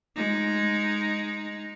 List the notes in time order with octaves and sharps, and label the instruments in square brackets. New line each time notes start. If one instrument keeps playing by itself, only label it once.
[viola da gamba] G#3 D#4